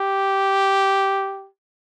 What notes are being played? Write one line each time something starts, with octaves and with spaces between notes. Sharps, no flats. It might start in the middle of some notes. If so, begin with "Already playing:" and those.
Already playing: G4